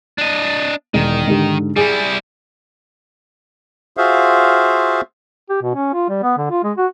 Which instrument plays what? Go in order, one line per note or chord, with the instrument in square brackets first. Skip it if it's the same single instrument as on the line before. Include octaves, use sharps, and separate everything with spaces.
[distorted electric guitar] D4 D#5
[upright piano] E1 [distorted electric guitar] D#3
[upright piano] G#2 D3 G4
[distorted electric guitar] G3 E4 [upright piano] G#4
[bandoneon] F4 F#4 G#4 C5 E5 F5
[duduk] G4
B2
C#4
F4
G3
B3
D3
F4
G#3
F#4